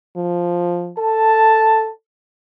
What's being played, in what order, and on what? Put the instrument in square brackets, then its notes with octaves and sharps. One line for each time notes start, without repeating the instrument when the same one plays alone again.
[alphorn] F3
[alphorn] A4 [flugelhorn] A5